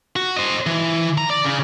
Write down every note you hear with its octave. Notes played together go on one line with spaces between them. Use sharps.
F#4
C5 D#5
E3
A#5
D5
C#3